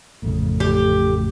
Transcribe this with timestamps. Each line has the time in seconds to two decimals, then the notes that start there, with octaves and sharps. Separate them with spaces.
0.23 A1 F2 C#3 A3
0.60 G4